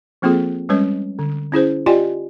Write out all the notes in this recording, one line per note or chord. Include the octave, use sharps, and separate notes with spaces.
F3 A#3 C4 F4 G#4 A4
G3 G#3 C#4 B4 C#5
D3
C#4 E4 G#4 C5
F4 G4 D5 D#5 G5 G#5